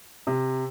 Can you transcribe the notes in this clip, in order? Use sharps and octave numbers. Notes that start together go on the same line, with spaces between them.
C3